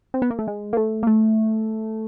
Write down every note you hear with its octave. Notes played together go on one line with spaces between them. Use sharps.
C4
B3
A#3
A3
G#3
A#3
A3
A#3
A3